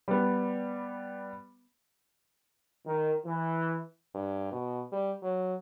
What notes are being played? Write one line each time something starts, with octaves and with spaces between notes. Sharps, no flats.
G3 B3
D#3
E3
G2
B2
G3
F#3